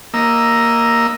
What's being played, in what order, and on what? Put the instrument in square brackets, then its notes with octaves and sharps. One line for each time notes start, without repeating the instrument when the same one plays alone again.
[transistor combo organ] A#3 D#5 E6